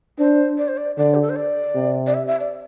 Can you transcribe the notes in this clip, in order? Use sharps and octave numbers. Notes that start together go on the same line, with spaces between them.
D4 C5
D5
C5
D5
D3 D5
G4
A4
C5
D5
C3
D5
E5
E5
D5